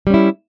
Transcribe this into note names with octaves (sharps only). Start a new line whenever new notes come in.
G3 C#4 E4